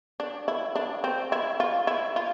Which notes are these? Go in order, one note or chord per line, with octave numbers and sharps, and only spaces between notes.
D4
E4
D4
C4
E4
F4
E4
F4